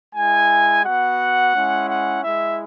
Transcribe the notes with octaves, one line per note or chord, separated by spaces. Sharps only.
G#3 E4 G#5
B3 F#4 F#5
G#3 C#4 E4
F#5
G#3 E4 E5